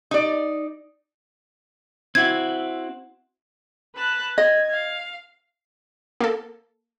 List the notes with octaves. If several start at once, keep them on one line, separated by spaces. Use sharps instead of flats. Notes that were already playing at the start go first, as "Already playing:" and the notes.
D#4 D5
C4 E4 F#4 G#6
B4 A5 F#6
D#5 G#6
F5
A#3 A4